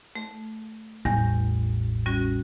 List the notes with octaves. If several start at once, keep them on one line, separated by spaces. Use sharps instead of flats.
A3
A1 E2 G3
G3 C#4 F#4